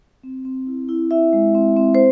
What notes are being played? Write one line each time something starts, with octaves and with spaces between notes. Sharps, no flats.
C4
C4
E4
E4
E4 E5
G#3
C4
C4
C5